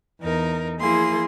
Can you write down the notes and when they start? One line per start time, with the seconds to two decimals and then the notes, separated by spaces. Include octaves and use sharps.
0.21 E2 D#4 A#4
0.79 F3 A#3 E4 G#4 C6